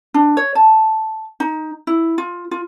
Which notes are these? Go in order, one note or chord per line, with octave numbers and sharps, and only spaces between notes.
D4
C#5
A5
D#4
E4
F4
F4